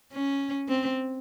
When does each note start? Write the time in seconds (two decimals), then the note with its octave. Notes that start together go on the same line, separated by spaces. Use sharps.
0.13 C#4
0.68 C4